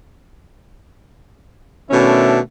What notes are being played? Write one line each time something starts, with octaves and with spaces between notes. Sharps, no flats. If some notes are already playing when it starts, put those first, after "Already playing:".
B2 D#3 A3 C#4 D4 E4